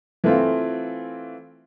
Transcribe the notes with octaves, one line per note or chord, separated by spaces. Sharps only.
E3 A3 C4 F4